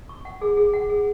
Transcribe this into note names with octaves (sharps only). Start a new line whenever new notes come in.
C#6
F#5
G#4
G#4
F#5
G#4